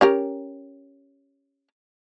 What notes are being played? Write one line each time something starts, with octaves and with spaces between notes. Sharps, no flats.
C#4 G4 A#4